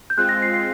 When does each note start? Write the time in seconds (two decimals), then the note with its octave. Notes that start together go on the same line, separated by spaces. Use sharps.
0.10 G6
0.17 G#3 C4 F4 F#6
0.29 A#6
0.42 C7
0.54 C7